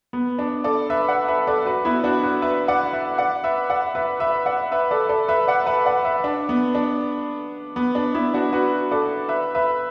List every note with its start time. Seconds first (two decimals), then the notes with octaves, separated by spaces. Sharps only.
0.13 B3
0.39 D4
0.64 A4 D5
0.90 B4 E5
1.08 D5 F#5
1.28 B4 E5
1.47 A4 D5
1.66 F#4 B4
1.85 B3 E4
2.04 D4 F#4
2.23 F#4 B4
2.42 B4 E5
2.68 D5 F#5
2.93 B4 E5
3.18 D5 F#5
3.44 B4 E5
3.70 D5 F#5
3.95 B4 E5
4.20 B4 E5
4.46 D5 F#5
4.72 B4 E5
4.91 A4 D5
5.09 A4 D5
5.28 B4 E5
5.47 D5 F#5
5.66 B4 E5
5.85 D5 F#5
6.05 B4 E5
6.24 D4
6.49 B3
6.75 D4
7.76 B3
7.95 D4
8.14 B3 E4
8.34 D4 F#4
8.53 F#4 B4
8.91 A4 D5
9.29 B4 E5
9.55 B4 E5